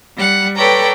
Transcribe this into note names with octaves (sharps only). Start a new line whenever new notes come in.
G3 F#5
A4 B4 C#5 D5 G5 A#5